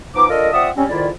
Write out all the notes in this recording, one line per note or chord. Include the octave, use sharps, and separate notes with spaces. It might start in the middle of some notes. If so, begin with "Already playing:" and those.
F3 B3 D#4 D6
D4 F4 A4 A#4 D#5
C4 F4 D5 E5 F#5 D#6
G3 C4 C#4
F2 G#2 D#3 E4 F4 D5